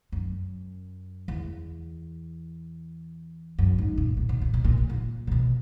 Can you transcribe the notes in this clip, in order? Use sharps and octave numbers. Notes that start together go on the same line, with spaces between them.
F#2
E2
F#2
G#2
A#2
A#2
B2
A#2
B2
A#2
B2
A#2
C#3
B2